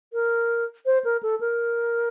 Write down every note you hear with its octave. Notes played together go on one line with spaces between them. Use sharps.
A#4
C5
A#4
A4
A#4